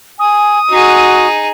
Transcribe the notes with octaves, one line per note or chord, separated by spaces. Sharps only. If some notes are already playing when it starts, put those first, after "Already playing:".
G#5 D#6
D#4 F#4 G#4